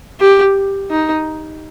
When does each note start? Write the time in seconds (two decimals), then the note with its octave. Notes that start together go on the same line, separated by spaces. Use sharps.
0.20 G4
0.91 D#4